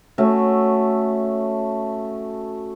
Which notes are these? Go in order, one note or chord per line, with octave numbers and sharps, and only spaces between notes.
A3 C#4 F#4